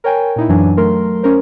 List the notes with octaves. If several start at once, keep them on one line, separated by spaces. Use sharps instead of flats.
A#4 C#5 G5 G#5
A#2 D#4 E4
F#2 E3 F#3 D4 G#5
F#3 A3 A#4 C6
C#4 A#4 C5